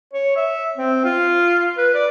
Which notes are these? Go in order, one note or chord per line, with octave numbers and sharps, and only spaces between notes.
C#5
E5
C4
F4
B4
D5